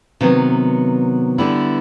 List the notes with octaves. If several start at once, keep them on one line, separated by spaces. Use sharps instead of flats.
C3 D#3 F#3 B3
D3 G3 B3 E4